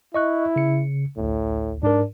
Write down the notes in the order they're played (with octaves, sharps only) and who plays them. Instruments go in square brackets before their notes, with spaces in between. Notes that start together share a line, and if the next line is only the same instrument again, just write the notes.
[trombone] E4 [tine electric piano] D#5 C#6 F#6
[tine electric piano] C#3 C#7
[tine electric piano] A1 D2 [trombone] A2
[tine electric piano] G#2 A#4 [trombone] D4